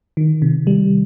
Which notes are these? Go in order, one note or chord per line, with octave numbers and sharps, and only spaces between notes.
D#3
C3
G3